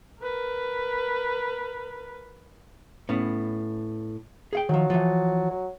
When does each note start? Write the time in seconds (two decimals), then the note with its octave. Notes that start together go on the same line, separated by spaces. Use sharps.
0.21 A#4 B4
3.09 A2 B3 C#4
4.53 G#4 F5 G5
4.69 D#3 F3 F#3
4.90 E3 F3
5.50 F#3